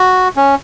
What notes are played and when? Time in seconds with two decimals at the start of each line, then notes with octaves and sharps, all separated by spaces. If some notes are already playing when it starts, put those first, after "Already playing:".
Already playing: F#4
0.37 C#4